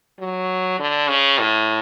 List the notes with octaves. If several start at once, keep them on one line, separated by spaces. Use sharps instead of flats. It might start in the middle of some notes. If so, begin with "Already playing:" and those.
F#3
D3
C#3
A2